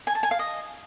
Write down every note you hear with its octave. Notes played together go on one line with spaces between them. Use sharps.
G#5
A5
G#5
F5
D#5